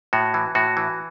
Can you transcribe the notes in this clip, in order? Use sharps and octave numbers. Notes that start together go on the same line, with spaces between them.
A2 F#4
E3
A2 F#4
E3